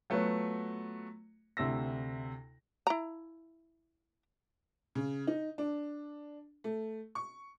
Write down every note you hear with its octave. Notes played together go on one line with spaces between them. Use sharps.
F#3 A3 B3 F4 B4 C#5
D2 C3 E4 E6 A#6
E4 A#5
C#3
D#4
D4
A3
C#6